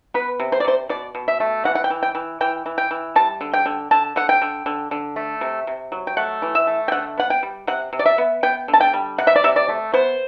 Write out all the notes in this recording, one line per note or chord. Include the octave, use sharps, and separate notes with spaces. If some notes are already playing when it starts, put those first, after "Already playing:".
B3 B4
C3
C5
D5
C3 C5
B2 D5
B2
E5
A3
E3 F#5
F#5
G5
E3
G5
E3
E3 G5
E3
G5
E3
G3 A5
D3
G5
D3
D3 A5
D3 F#5
G5
D3
D3
D3
A3
C3
C3
F#3
G5
A3 F#5
E3
E5
A3
G5
D3 F#5
B3 F#5
G5
G3
C3 F#5
C3
D5
E5
B3
B3 G5
D3
A5
G5
G3
C3 F#5
E5
D5
C3 E5
D5
A3
B3 C5